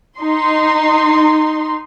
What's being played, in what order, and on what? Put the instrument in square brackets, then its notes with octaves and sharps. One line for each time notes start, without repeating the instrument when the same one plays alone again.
[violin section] D#4 C6